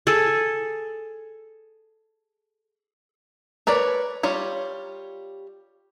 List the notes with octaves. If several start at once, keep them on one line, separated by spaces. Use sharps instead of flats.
G#4 A4
A#4 B4 C#5 D5
G3 F4 C#5